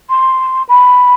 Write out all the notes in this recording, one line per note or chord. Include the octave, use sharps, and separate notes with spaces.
C6
B5